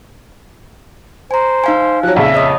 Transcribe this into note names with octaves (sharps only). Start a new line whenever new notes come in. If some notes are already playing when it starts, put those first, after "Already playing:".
C5 G#5 A#5
D#4 F5 G#5
F3 F#3 F#6
A#1 F2 C#3 E5
C#5 D#5 D#6